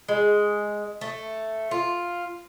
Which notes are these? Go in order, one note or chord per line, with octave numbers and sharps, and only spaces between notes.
G#3
A3
F4